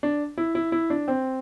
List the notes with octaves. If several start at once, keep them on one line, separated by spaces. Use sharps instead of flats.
D4
E4
E4
E4
D4
C4